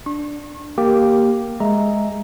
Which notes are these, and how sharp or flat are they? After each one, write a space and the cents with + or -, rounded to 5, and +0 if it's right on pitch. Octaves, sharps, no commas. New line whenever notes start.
D4 +0 C#6 -40
A#3 +0 G4 +0
G#3 +0 E5 +0 A#5 +0